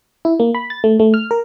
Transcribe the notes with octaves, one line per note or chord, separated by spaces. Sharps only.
E4
A#3
B5
A6
A3
A3
F6
A#4